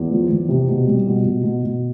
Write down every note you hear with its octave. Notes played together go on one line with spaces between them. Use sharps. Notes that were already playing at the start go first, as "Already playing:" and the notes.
Already playing: E2
F3
E2
C3
B2
G3
B2
B2
B2
B2